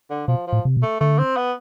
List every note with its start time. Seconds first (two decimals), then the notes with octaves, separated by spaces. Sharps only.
0.10 D3
0.28 B2 F3
0.47 F3
0.53 A2
0.65 C3
0.77 B2
0.83 A3
1.00 D3 A3
1.18 C4
1.36 B3